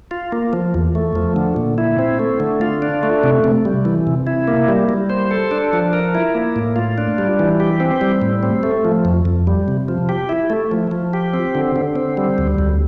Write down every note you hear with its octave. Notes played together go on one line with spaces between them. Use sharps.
F4
A#3
F3
E2
A3
F3
D3
A#2
E4
C4
A3
D3
F4
D4
A3
C3
C3
G3
E3
C3
E4
A#3
G3
G3
C5
A4
D4
F3
A#4
E4
A#3
A2
F4
D4
G3
E3
G4
C4
G3
A2
C4
A3
F3
F2
F2
G3
C3
F3
G4
E4
A3
F3
F3
G4
C4
D3
D3
C4
G3
D2
D2